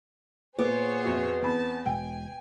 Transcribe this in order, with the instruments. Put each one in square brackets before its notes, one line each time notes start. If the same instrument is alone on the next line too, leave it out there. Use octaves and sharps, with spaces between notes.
[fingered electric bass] A#2 [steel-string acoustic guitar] B3 [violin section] G#4 C5 C#5 [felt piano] D6
[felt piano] F2 F#4 E5
[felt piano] E2 B5 [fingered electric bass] C4 [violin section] A5
[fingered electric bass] E1 B2 G#3 [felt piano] G5 [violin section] G#5